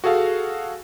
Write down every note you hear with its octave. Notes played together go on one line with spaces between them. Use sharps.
F#4 G#4 A4 F5